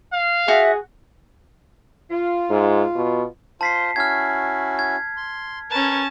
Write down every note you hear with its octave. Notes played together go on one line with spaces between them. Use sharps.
F5
F#4 G#4 E5 F#5
F4
G#2
B2
F4 C5 A5 B6 C7
C#4 E4 F#4 F6 G#6
G#6
C6
C#4 A#4 B4 A5